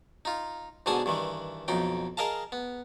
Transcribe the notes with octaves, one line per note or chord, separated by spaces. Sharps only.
D#4 F4
G#2 B2 D3 G#5 A5 D#6
G2 D#3 E3
B1 F2 D#4 G5
G#4 A#4 D#5 F5 A5
B3